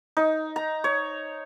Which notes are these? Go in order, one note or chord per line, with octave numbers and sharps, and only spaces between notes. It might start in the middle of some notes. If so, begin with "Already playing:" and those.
D#4
A#5
C#5